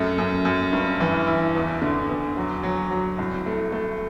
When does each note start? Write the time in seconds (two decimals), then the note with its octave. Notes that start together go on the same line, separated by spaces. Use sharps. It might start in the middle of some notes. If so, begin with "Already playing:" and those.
Already playing: F#2 A3
0.18 F#2
0.45 F#2
0.73 G2
1.00 E3
1.27 E4
1.55 E2
1.82 D3
2.09 E2
2.37 F#3
2.63 F#3
2.91 F#3
3.18 C2
3.46 A3
3.72 A3